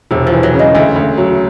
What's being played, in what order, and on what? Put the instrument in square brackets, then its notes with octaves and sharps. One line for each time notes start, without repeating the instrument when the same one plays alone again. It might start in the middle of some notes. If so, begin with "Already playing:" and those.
[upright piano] E1 [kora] C3
[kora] F3
[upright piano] E3
[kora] F#3
[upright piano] C#3
[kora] G#3
[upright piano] D2 [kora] A3
[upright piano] D2
F#3